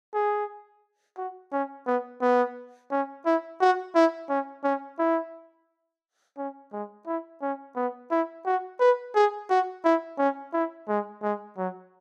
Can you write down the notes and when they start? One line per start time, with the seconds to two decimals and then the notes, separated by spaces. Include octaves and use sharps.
0.14 G#4
1.17 F#4
1.52 C#4
1.87 B3
2.22 B3
2.91 C#4
3.26 E4
3.61 F#4
3.95 E4
4.29 C#4
4.64 C#4
4.99 E4
6.38 C#4
6.73 G#3
7.07 E4
7.42 C#4
7.76 B3
8.11 E4
8.46 F#4
8.80 B4
9.15 G#4
9.50 F#4
9.85 E4
10.18 C#4
10.53 E4
10.88 G#3
11.23 G#3
11.58 F#3